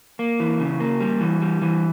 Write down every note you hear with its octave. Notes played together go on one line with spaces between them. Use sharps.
A#3
E3
C#3
A#3
G3
E3
G3
E3